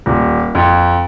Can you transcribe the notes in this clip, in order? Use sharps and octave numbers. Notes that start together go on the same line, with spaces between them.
D#1
F2